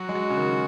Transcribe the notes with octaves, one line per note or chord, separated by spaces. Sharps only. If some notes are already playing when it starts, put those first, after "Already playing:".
Already playing: F#3 F#4
G#3
F#3
C#3
D#3